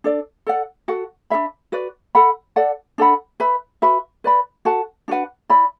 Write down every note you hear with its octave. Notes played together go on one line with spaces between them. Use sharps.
D4 A4 D5
A4 D5 F#5
F#4 A4 F#5
D4 A4 E5 B5
F#4 B4 D5
A4 F#5 B5
A4 D5 F#5
D4 A4 F#5 B5
B4 E5 B5
F#4 B4 E5 B5
B4 D5 B5
F#4 A4 F#5 A5
D4 F#4 B4 F#5
E4 D5 B5